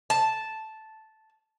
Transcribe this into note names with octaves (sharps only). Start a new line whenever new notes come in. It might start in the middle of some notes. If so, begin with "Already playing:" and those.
A5